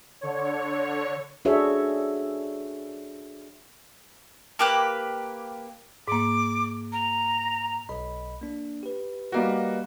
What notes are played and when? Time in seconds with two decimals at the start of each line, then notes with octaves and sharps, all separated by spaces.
0.21 D3 C#5
1.45 D4 F#4 G#4 A4 C#5 E5
4.59 A#3 G4 B4
6.08 G#2 A#3 D6
6.92 A#5
7.89 B1 D#5 B5
8.41 A#3 D4
8.83 G4 B4
9.32 G3 A#3 F#4 B4 D#5 F5